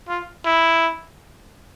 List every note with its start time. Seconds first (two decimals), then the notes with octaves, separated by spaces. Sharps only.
0.08 F4
0.45 E4